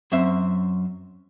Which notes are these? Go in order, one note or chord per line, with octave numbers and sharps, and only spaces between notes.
F#2 C4 E5